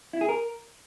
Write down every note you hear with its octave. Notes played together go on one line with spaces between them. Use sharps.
E4
G#4
A#4